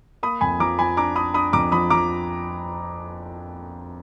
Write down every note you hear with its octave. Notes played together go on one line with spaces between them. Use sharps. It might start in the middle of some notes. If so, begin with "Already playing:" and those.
A#3 B5 D#6
F2 G#5 B5
F3 A#5 D6
F3 G#5 B5
D4 A#5 D6
D4 B5 D#6
D4 B5 D#6
F2 A#5 D6
F3 B5 D#6
F3 A#5 D6